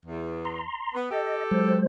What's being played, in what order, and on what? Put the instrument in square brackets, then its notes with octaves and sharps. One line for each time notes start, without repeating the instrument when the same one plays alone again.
[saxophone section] E2
[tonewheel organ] A#5 C6
[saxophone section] B3
[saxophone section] G4 A4 [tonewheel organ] D#5
[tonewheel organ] F#3 G#3 C5